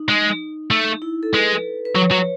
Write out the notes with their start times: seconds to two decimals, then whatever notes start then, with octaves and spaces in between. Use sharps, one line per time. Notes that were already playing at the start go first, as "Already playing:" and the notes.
Already playing: D#4
0.09 G#3
0.71 A3
1.02 E4
1.23 A4
1.33 G#3 B4
1.85 B4
1.95 F#3 C#5
2.11 F#3